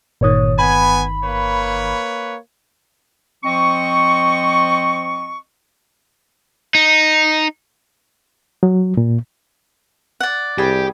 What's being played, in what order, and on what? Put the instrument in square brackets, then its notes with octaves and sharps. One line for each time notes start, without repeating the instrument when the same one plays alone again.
[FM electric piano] G1 D#3 [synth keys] A#2 C#5 D#6
[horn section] B3 G#5 [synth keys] B5
[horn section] A#3 B4 C#5
[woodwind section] F3 C4 D#5 C#6
[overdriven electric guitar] D#4
[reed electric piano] F#3
A#2
[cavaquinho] D5 F#5
[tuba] C2 [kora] G3 G#4 [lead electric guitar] G4